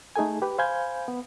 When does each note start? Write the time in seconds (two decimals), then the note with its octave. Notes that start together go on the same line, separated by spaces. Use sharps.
0.16 A3 D#4 G#4 A4 G#5
0.42 G4 B4
0.58 C5 F5 G#5 B5 G6 G#6
1.08 B3